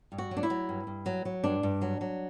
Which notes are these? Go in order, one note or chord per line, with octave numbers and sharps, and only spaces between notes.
G2
F#4
F#3
D4
E4
F#3
G2
G2
F#3
F#3
G2 D4
G2
F#3
F#3